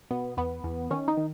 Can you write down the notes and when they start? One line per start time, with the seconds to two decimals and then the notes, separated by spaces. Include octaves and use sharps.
0.11 B2 B3
0.37 E2 B3
0.64 E2
0.90 D#3 C#4
1.08 D#4
1.17 D#3